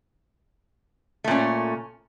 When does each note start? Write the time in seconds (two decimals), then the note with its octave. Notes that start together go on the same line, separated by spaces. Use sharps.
1.24 A3
1.28 A#2
1.31 C#4